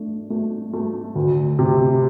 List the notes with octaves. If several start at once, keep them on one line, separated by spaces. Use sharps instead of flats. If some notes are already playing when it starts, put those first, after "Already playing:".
Already playing: A3 D4
A3
A3
D2
C3